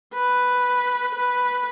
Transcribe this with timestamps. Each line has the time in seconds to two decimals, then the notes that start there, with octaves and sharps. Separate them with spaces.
0.14 B4
1.15 B4